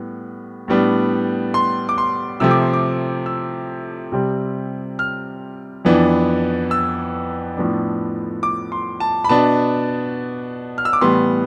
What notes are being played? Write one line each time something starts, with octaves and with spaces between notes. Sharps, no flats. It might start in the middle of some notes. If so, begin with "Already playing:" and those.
Already playing: A2 G3 B3
A2 G3 B3 D4
C6
D6
C6
C3 F3 A3 C4 E6
D6
C6
D6
E6
C3 G3 C4
F6
F2 E3 B3 D4
E6
A2 F3 B3 D4
D6
C6
A5
B5
B2 B3 D4 A5
F6
E6
D6
A2 E3 G3 B3 C6